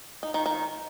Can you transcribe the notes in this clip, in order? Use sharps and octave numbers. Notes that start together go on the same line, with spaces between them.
D#4
D#3
D#3